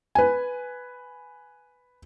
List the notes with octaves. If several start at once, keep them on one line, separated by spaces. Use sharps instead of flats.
B4 G#5